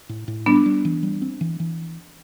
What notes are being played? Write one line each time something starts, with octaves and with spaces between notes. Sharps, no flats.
A2
A2
G3 B3 D4
G3
E3
G3
C4
E3
E3